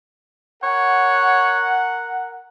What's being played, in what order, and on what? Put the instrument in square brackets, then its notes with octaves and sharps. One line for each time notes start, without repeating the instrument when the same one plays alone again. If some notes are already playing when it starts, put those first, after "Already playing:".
[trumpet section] A#4 F#5 [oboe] C#5